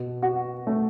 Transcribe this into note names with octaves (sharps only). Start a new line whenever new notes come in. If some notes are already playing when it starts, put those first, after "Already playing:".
Already playing: B2
F#4
A3